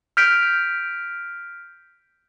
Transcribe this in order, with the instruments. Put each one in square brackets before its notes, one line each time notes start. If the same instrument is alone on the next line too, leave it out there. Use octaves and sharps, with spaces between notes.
[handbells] F6 G6 B6 D7